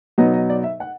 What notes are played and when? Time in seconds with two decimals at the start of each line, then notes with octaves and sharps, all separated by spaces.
0.18 B2 F#3 B3 D#4 D#5
0.34 D#5
0.49 D5
0.64 E5
0.80 F#5